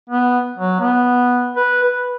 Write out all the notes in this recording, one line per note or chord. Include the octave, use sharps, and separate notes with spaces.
B3
F#3
B3
B4
B4